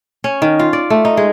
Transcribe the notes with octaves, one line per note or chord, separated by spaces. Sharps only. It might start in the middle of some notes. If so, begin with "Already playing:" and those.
C#4
D#3
F4
D5
A3
D#4
G#3